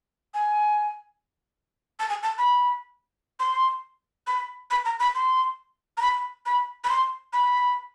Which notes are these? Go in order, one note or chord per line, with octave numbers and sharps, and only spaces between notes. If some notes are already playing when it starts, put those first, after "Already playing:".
G#5
A5
G#5
A5
B5
C6
B5
B5
A#5
B5
C6
A#5
B5
B5
B5
C6
B5